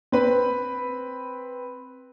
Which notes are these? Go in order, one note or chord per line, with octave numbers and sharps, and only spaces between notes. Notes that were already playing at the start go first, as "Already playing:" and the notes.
C4 B4 B5